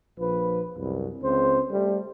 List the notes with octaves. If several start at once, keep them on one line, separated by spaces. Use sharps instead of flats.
A#1 F3 B4
C2 F#2
C#2 C4 C5
G3 A3